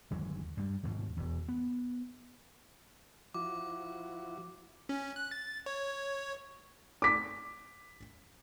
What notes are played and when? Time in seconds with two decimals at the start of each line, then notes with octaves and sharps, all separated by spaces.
0.11 G1 D#2 F#3 G#3
0.57 G2 G3
0.83 D#2 G#2 B2 F3
1.17 E1 E2
1.48 B3
3.34 F3 E4 F#4 D6
4.89 C#4
5.16 F#6
5.31 A6
5.66 C#5
7.02 D6 B6